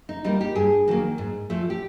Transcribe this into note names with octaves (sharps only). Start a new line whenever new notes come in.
D#4
G3 A#3 D#4
G4
G2 G#4
D#3 F#3 A#3
G#2
F3 A3
G4